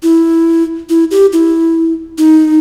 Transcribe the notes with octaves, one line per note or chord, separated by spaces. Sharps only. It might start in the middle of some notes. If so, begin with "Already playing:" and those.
E4
E4
G4
E4
D#4